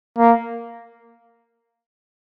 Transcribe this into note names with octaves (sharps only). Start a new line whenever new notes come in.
A#3